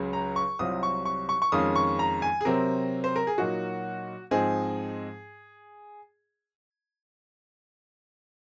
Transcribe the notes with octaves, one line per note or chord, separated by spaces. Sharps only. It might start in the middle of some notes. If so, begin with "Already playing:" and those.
Already playing: C#2 C#3 F#3 C#4
A#5
C#6
C2 C3 F#3 C4 F4 D#6
C#6
C#6
C#6
C#6
F2 D#3 G#3 C#4 F4 D#6
C#6
A#5
G#5
G#4
C3 F#3 C4 A#4
C5
A#4
G#4
A#2 F#3 A#3 D#4 F#4
G#2 F3 C4 D#4 G#4